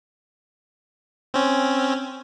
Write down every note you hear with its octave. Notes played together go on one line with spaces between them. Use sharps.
C4 C#4